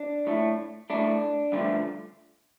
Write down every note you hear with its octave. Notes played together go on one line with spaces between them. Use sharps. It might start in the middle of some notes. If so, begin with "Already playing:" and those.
Already playing: D4
A2 A3
A2 A3 D4
G2 D3 F3 A3